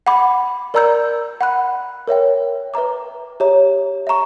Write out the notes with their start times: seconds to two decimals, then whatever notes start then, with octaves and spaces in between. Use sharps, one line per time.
0.07 F#5 B5 D6
0.74 A#4 D5 A#5 E6 G6
1.41 F#5 B5 F#6
2.08 A#4 C#5 E5 G5
2.74 B4 E5 A#5 D6
3.40 G4 C#5 E5 A#5
4.07 E5 A#5 C#6